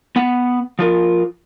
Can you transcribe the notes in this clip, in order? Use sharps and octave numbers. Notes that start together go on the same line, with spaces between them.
B3 F#5
F3 F4 A#4